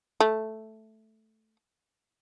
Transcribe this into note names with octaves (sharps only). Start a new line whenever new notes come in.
A3